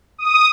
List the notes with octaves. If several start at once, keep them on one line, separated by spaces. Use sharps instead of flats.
D#6